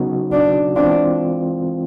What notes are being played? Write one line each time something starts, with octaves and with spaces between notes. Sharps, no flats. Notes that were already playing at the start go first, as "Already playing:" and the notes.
Already playing: C#3 F#3 B3 D#4 F#4
D4
E3 G#3 C4 D4 F4